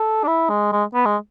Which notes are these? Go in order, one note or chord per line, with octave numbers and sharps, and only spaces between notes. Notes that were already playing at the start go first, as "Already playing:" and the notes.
Already playing: A4
D4
E4
G#3
G#3
B3
G#3